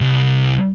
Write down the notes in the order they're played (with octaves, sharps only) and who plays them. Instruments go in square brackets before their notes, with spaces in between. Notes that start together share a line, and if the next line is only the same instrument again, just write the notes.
[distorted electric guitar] C2